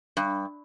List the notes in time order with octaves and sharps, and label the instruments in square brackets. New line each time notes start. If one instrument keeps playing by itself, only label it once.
[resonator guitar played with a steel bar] G2